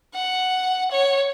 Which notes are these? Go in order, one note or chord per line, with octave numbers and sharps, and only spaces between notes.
F#5
C#5